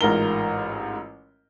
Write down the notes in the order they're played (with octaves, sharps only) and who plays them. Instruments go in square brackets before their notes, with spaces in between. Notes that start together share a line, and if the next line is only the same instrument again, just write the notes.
[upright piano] A1 G#2 F4 A#4 A#5 G7